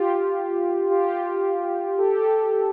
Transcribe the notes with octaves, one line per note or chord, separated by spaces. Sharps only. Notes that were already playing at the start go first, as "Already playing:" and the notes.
Already playing: F4 G4
F4 G4
G4 A4